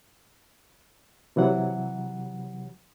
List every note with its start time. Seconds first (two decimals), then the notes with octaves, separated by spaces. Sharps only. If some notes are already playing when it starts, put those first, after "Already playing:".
1.36 C3 E3 F#3 F#5